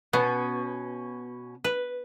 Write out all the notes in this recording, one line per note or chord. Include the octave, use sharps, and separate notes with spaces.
B2 B3 C#4
B4